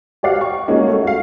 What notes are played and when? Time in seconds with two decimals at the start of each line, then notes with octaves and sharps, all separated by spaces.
0.23 F#4 G4 D5 F5 F#5
0.41 C#6
0.68 G#3 A#3 C#4 F4 F#4
0.88 A3
1.03 F#4 F5